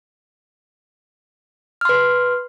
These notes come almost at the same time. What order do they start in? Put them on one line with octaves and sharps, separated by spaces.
F6 C6 B4